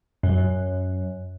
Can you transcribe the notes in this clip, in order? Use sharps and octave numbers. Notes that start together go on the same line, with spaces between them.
F#2